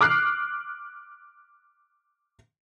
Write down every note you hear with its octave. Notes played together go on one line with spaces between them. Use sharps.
D6 F6 F#6 C7